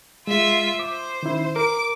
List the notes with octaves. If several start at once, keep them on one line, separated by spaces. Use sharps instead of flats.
G#3 F4 E5
C5 D6
D#3 C#4 E4
A#4 D6 D7